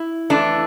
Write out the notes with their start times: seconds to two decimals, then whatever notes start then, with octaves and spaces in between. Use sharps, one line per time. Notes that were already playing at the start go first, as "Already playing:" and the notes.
Already playing: E4
0.30 F2 E3 A3 D4